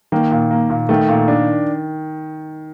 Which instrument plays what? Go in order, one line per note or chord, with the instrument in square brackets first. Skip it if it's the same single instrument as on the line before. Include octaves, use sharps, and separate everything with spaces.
[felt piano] D#3 [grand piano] A#3
[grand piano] A#2
A#3
A#2
[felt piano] D#3 [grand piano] A3
[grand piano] A#2
D4